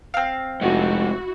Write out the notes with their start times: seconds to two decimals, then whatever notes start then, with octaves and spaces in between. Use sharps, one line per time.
0.14 C4 F5
0.61 F1 G#3 E4 F#4 F#5